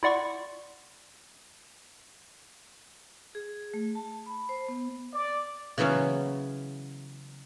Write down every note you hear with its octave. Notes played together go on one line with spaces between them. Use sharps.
E4 F4 D5 F#5 C6 C#6
G#4
A3
A5
B5
C5
B3
D5
C#3 E3 F#3 B3 C#4